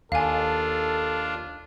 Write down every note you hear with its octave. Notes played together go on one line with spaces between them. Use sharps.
D#2 D4 F4 A4 F5 G#5